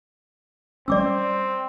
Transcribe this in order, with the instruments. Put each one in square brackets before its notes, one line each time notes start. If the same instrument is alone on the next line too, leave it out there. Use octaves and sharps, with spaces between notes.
[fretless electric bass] G3 A3 C#4 [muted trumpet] C4 [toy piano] D5 D6 E6